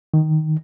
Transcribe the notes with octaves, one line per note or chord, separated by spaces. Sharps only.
D#3